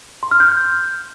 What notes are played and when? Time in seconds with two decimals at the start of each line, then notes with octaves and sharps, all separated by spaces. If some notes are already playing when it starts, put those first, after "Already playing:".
0.23 C6
0.31 F6
0.40 G6